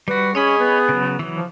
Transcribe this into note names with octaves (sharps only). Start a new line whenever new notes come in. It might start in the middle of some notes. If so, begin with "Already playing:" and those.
G3 F#4 B4
C#4 G#4 C#5 D#5 B5
B3
C#3 F#3
E3 F#3
F3